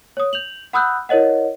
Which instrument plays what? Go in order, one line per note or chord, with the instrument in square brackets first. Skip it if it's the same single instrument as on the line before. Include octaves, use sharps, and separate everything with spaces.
[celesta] C#5 D#6
G6 F7 F#7
F#5 B5 D#6 E6 F#6 G6
E4 A#4 C#5 D#5 F#5